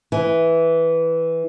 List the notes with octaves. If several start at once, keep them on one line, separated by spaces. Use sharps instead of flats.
E3